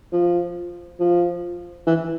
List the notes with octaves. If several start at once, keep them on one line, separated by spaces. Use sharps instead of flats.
F3
F3
E3